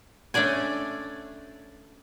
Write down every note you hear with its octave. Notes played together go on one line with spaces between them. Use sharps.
A3 C#4 D4 D5 G#5